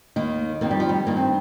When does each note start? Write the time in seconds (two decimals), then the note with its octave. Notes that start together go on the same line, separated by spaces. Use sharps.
0.16 D#2 D#3 A#3
0.61 F2 D#3 A#3
0.71 G3
0.80 F3
0.89 G3
1.06 G2 D#3 A#3
1.17 C4